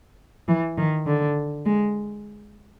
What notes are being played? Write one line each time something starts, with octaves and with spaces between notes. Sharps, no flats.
E3
D#3
D3
G#3